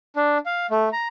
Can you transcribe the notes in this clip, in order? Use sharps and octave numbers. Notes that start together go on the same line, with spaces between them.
D4
F5
A3
A#5